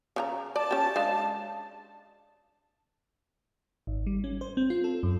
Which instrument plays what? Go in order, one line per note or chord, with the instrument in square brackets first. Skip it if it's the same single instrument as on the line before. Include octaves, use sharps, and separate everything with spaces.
[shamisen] C#3 D4 A#5
[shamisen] D5 [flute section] A5
[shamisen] C#4 G4
G#3 D4 F5
[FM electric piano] G#1
G3
C#4
C5
C4
F4
A4
F#2